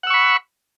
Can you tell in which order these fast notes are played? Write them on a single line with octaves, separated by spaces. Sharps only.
F#5 E6 C#6 B5